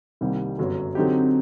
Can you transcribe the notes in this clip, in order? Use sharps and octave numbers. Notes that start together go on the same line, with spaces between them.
C2 C3 D#3 G3 A#3
G1 F#2 F#3 A3
D3 F#3 C4 D#4 G4